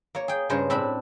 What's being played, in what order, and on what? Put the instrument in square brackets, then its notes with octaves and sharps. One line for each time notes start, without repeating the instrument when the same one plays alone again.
[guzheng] A#3 C#5
G#4 G5
G2 C#3 G#3 A#4 C5 C#5
A2 C4 D4 B5